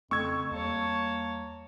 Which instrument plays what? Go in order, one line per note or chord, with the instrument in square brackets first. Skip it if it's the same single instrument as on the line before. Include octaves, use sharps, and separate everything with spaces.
[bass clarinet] F2 [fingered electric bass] C#3 A3 [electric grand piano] C#6 E6 G#6
[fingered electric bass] E2 G3 [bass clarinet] A#3 [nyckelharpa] C#5 A5